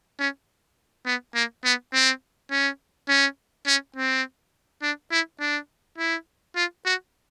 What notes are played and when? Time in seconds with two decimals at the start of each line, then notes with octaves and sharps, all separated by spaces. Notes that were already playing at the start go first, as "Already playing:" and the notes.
0.19 C#4
1.06 B3
1.35 A#3
1.65 B3
1.93 C4
2.51 C#4
3.08 C#4
3.67 C#4
3.96 C4
4.82 D4
5.11 E4
5.40 D4
5.98 E4
6.56 F4
6.85 F#4